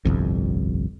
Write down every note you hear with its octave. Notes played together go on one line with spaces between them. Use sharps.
G1 C2 F2